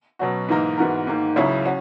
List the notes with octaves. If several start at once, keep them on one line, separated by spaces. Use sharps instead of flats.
B2 F#3 C#4 F#4
G#2 E3 A#3 D#4 A#4
G#2 E3 B3 F#4 A#4
G#2 D#3 A#3
C#2 C#3 F#3 C#4 E4
C#4 F#4